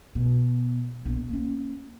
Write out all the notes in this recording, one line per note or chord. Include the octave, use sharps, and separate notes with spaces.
B2
A#1 B3
A#3 C#4